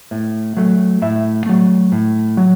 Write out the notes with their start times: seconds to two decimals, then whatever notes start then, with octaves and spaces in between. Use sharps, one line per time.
0.11 A2
0.57 F#3 A3
1.02 A2 E5
1.46 F#3 A3
1.92 A2
2.37 F#3